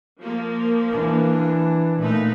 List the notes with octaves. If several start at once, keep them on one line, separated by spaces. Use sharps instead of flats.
F3 A#3
E3 D4
A#2 A3 D#4 B4